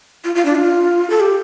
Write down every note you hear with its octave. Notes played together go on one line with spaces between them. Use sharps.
F4
F4
D4
F4
A4
G4